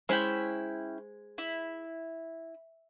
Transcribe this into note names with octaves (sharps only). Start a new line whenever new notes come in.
G#3 C#4 E4 C5 G5
E4